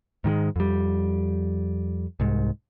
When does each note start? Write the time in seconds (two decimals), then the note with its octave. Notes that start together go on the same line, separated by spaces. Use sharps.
0.24 G#2 D#3 F#3 G#3
0.56 F2 G3
2.20 C2 G#2